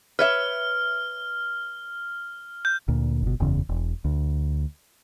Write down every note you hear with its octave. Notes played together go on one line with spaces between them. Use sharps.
B4 C#5 E5 F6
G6
D2 A#2
G1 B2
F#1 E2 C#3
E1
D2